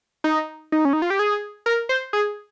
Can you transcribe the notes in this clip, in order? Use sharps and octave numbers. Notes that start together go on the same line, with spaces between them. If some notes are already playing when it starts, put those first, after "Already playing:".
D#4
D#4
C#4
D#4
F4
G4
G#4
A#4
C5
G#4